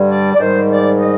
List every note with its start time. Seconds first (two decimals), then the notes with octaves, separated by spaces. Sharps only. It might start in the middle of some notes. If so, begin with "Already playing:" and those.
Already playing: G2 D3 G3
0.10 D5
0.35 D5
0.40 G#2 D#3 G3 C5
0.70 D5
0.99 D#5